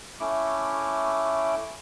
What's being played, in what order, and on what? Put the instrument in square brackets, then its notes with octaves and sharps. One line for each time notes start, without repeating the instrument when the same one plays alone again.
[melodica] A3 C#4 E4 D6